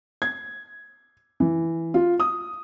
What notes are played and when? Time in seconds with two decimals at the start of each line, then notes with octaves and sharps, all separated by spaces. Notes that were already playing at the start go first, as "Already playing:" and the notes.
0.22 G#6
1.40 E3
1.94 F4
2.20 D#6